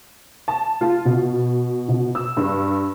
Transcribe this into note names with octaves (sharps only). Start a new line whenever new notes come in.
A5
F4
B2
B2
E6
G2